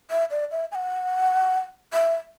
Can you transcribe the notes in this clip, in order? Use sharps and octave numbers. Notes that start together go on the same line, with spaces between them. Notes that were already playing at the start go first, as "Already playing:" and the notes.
E5
D5
E5
G#5
F#5
E5